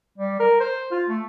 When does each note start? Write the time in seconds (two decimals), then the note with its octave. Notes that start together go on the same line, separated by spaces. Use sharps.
0.18 G3
0.40 A#4
0.60 C5
0.92 F4
1.08 A3